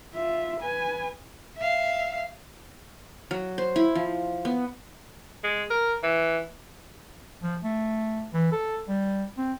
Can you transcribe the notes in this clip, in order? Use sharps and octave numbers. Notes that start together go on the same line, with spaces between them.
F4 E5
B4 G#5
E5 F5
F#3
C5
E4
F3
B3
G#3
A#4
E3
F3
A3
E3
A4
G3
C4